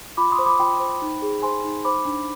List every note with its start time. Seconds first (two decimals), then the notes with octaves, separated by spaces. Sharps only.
0.17 F4 B5 D6
0.31 C6 D#6
0.39 C5
0.46 B5 D6
0.60 F4 G5 B5
0.80 C5
1.02 D#4
1.22 G#4
1.42 C5 G#5 C6
1.64 D#4
1.85 C5 B5 D6
2.05 D4